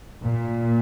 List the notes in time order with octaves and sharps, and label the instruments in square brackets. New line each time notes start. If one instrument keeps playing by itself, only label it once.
[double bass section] A#2